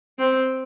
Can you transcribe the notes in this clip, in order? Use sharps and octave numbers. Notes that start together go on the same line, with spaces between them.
C4